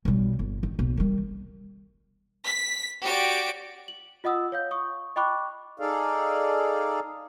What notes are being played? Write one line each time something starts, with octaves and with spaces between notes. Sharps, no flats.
B1 G3
G1
D#3
B1
D#3 G3
B6
F#4 G4 D5 D7
F#7
F4 D#5 F#5 D#6 E6
C#5 F5 G6
C#6 D#6
D#5 G5 B5 C#6 D6 F#6
D#4 G#4 A4 D5 F5